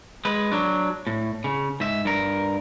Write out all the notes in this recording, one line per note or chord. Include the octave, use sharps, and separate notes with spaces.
G#3 B4
F#3 D4
A2
C#3
G#2 E5
G2 A#4